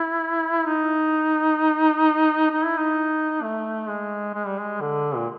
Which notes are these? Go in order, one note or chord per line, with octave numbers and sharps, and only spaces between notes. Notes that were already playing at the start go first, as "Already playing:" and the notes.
Already playing: E4
D#4
D#4
E4
D#4
A3
G#3
G#3
G3
G#3
D3
A#2